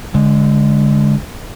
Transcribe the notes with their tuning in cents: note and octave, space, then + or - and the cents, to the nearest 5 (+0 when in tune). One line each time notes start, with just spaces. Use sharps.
D3 -25 G#3 +0